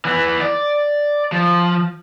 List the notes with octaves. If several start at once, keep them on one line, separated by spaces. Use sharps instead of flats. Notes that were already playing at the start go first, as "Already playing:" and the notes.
E3 B3
D5
F3